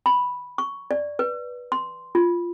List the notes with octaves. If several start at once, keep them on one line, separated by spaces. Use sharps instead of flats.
B5
C#6
D5
B4
C6
F4